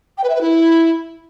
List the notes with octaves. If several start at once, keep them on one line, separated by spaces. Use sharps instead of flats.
G5
B4
E5
B4
E4